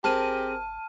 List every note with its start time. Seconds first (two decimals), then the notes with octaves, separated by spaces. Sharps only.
0.04 G#1 C4 G4 G#4 A#4 A5 F6 D#7